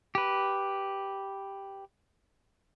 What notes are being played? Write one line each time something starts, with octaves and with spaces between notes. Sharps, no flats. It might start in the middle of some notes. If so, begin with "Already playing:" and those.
G4 B4